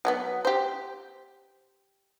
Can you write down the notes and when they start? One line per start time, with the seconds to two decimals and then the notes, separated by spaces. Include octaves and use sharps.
0.05 F#3 G#3 B3
0.45 G4 C5